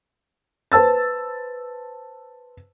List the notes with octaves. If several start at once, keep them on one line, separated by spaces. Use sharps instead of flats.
B4 C5 A5 E6 A6